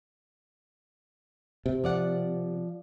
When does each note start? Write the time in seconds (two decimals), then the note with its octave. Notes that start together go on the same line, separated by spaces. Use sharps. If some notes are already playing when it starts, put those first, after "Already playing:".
1.66 C3
1.84 F3 D5 F#5